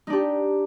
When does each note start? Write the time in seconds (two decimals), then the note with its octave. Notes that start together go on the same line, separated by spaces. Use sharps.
0.07 D#4
0.10 D4
0.13 G4